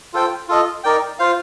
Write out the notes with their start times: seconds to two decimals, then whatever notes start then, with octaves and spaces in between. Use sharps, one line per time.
0.13 F4 A4 C5 G5
0.48 F4 A4 D#5
0.84 D#4 A#4 D5 G5
1.19 F4 C5 F5